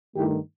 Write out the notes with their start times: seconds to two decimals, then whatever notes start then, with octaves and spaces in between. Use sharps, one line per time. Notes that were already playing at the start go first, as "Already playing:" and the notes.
0.15 G2 D#3 A3 E4 G4